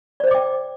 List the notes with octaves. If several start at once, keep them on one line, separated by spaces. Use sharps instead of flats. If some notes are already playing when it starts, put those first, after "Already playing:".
C5 D5 D#5 G5 D6